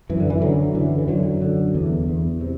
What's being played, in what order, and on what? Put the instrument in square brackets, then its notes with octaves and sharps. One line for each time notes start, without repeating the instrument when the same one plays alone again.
[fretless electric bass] F#2 E3
D3
E3
F#2 D3 F#3
D3 E3
E3
F#2 D3 F#3
D3
E2 E3
E2
C3